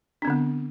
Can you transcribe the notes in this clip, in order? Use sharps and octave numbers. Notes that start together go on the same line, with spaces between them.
D3 B3 C4 D4